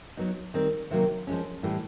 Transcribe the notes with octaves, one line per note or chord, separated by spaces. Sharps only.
F#3 B3 D#4
D#3 G3 C4
C3 D#3 F#3 A#3
F3 G#3 C#4
A2 E3 G3